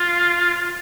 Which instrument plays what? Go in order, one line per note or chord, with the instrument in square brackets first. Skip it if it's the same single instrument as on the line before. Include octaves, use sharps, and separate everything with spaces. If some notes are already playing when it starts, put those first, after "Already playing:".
Already playing: [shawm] F4